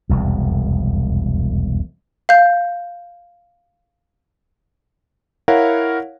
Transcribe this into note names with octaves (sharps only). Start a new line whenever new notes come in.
E1 C2 F2
F5 G6
E4 A#4 C#5 F5 F#5